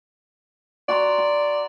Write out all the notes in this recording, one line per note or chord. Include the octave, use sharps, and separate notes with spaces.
F#4 D5 A#5 C6
C6